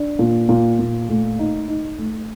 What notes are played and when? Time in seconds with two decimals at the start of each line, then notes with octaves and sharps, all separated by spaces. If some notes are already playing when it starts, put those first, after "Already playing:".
Already playing: D4
0.19 A#2
0.49 A#2
0.79 A#2
1.09 A3
1.39 D#4
1.68 D#4
1.98 A3